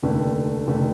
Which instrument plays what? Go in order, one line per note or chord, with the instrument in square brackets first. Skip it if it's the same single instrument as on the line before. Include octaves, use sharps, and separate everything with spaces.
[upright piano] F1 D#2 D3 A3
F1 D#2 D3 A3